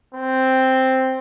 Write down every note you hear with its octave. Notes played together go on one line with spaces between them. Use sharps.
C4